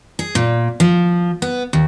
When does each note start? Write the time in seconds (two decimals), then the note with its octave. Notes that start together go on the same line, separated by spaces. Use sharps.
0.19 G#4
0.35 A#2
0.80 F3
1.42 B3
1.73 D#2